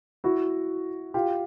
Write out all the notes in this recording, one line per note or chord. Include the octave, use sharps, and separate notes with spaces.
E4 F#4
F4 G4